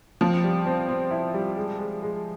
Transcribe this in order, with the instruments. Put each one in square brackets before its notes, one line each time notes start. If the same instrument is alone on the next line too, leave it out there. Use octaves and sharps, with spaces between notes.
[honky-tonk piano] F3 [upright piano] C4
[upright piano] G3
C4
C4
E4
G3
G#3
G#3
G#3